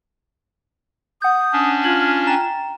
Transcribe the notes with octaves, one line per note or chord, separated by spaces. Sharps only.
F#5 D#6 G6
C#4 D4
F4 F6 G#6 F#7
G5 A#5 A6 E7